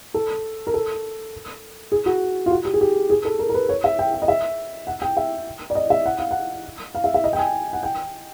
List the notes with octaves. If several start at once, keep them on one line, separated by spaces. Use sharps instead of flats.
A4
A#4
A4
G#4
F#4
F4
F#4
G4
G#4
G4
G#4
A4
A#4
A#4
B4
C#5
E5
G5
G5
D#5
E5
F#5
G5
E5
D5
D#5
E5
F#5
F5
F#5
F5
E5
E5
D#5
G5
G#5
F#5
G5